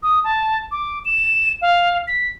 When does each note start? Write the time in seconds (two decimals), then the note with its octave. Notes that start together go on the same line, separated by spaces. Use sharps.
0.03 D#6
0.24 A5
0.71 D6
1.05 E7
1.62 F5
2.08 B6